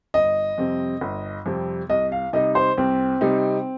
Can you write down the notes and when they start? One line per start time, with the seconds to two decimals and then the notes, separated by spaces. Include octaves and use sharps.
0.14 G1 D#5
0.58 F2 C3 G3 C4
1.01 G1
1.46 F2 C3 G3 C4
1.89 C2 D#5
2.12 F5
2.33 C3 G3 D#4 D#5
2.55 C5
2.78 C2 C4
3.21 C3 G3 D#4